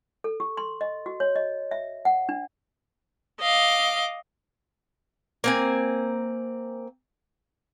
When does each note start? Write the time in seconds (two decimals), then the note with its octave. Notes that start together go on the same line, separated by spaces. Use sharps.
0.24 A4
0.40 G4
0.57 C6
0.81 D#5
1.06 F#4
1.20 C#5
1.36 D#5
1.71 E5
2.05 F#5
2.29 D4
3.41 D#5 F5 D6
5.44 A#3 C4 G#5